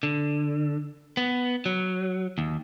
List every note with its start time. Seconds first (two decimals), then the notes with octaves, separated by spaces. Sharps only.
0.03 D3
1.17 B3
1.66 F#3
2.38 D#2